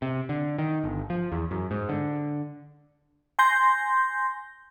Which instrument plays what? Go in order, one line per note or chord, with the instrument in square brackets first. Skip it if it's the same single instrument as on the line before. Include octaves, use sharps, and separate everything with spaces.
[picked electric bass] C3
D3
D#3
G1
F3
E2
F#2
G#2
D3
[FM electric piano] G#5 C6 G6 A#6